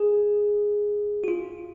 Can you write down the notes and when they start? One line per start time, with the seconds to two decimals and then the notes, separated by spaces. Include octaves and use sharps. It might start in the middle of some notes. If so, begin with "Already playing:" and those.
Already playing: G#4
1.24 F#4
1.28 F4